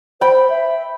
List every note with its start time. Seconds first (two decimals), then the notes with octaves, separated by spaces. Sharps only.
0.21 C5 G5 B5
0.50 E5